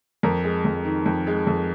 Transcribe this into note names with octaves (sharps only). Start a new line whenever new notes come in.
F2 A#4
G#3
F2
D#3
F2
G#3
F2